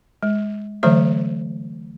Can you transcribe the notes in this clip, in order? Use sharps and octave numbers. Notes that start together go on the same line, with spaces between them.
G#3
D3 E3 F#3 A3 C5 E5